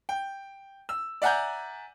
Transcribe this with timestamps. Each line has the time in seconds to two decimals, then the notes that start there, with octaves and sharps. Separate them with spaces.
0.09 G5
0.89 E6
1.22 D5 E5 F#5 G#5 A#5 G6